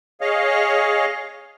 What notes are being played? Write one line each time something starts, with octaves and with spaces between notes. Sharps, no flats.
G#4 C#5 D#5 F5